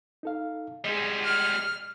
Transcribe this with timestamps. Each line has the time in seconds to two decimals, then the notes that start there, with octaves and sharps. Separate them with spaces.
0.23 D#4 A4 F5
0.85 G3 G#3 G#4 D#5
1.25 F6